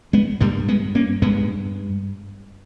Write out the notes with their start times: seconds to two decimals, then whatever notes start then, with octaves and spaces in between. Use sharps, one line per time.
0.13 G#3 B3
0.41 G2 G3 A#3
0.68 G#3 B3
0.95 A#3 C#4
1.22 G2 G#3 B3